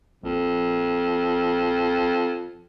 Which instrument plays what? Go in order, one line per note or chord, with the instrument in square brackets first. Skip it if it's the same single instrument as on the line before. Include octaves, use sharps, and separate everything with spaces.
[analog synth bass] A#1 [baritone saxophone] F2